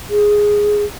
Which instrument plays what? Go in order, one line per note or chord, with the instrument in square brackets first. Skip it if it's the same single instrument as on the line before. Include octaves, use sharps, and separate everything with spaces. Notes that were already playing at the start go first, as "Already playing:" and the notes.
[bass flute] G#4